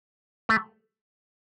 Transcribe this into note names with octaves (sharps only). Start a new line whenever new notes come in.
A3